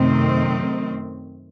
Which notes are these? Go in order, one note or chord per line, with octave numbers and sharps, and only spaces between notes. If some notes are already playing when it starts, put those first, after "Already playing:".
Already playing: F#2 C3 D#3 A3 C4